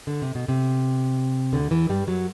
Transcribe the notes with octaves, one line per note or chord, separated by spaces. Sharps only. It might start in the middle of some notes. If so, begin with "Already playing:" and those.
D3
C3
B2
C3
D2 D3
E2 E3
G2 G3
F#2 F#3